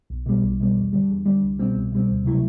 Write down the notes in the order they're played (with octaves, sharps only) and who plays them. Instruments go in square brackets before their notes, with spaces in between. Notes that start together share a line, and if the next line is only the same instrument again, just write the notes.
[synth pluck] B1
B2 G3
B1
B2 G3
E2
D3 G3
E2
D3 G3
C2
B2 G3 C4
C2
B2 G3 C4
D2
C3 F#3 A3 E4